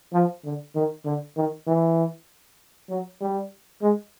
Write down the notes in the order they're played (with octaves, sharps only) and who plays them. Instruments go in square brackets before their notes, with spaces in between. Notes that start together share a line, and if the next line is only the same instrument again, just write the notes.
[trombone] F3
D3
D#3
D3
D#3
E3
F#3
G3
G#3